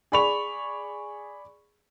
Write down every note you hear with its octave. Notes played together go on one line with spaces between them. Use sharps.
G#4 D5 B5 C#6 F7